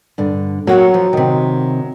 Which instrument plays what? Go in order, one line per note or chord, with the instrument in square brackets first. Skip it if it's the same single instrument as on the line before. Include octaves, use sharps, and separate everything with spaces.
[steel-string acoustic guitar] G2 D3
[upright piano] F#3 [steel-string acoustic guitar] A#3 F#4 F#5
[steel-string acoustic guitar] F3
C3 D#3